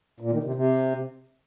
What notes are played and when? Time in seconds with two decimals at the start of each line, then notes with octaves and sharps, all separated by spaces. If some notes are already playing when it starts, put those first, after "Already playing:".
0.20 A#2
0.32 D#3
0.43 C3
0.55 C3